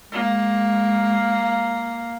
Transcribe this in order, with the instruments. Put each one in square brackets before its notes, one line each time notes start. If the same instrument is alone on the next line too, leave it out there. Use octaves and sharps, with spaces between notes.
[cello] G#3 [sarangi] A#3